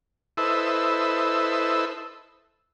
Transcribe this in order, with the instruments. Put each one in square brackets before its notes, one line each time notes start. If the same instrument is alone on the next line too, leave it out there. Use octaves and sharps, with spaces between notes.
[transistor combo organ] E4 A4 B4 C5 D#5 E5